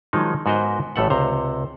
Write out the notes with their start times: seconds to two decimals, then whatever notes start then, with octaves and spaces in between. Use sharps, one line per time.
0.13 D#3 F3 F#3 G#3 D#4
0.46 G#2 B3 F#4 A#4 C5 D#5
0.96 A1 A2 A3 A4 E5 F#5
1.10 C#2 C3 C5 A#5